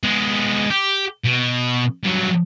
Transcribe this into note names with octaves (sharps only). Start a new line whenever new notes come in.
G#3 B3
G4
B2
G2 F#3